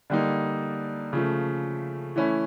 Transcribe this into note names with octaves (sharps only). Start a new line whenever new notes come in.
D3 G3 A#3 D#4
C#3 F3 A3
E3 A3 C#4 E4